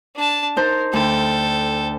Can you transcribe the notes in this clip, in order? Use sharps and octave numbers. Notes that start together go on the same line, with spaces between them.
D4 A5
D#4 A#4 C5 A5
D2 A4 G5